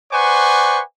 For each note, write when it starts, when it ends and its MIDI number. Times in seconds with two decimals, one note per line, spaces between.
0.12 0.80 71
0.12 0.80 72
0.12 0.80 74
0.12 0.80 78
0.12 0.80 80
0.12 0.80 85